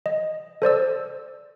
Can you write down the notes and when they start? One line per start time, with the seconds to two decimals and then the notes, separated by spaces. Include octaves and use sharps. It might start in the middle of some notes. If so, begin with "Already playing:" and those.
0.06 D#5
0.62 A4 C5 D5 E6